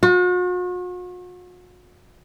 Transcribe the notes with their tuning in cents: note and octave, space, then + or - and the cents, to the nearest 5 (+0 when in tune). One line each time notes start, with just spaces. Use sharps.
F#4 -45